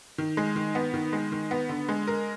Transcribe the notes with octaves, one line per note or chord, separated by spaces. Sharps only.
D#3
G#3
D#3
B3
D#3
G#3
D#3
B3
D3
G#3
A#4